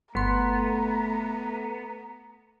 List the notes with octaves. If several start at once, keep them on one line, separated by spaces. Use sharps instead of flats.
G1 A3 B3 A#5 C6